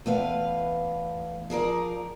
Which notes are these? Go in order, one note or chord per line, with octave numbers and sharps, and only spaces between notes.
E2 A3 B4 F5
F3 G#4 A#4 D5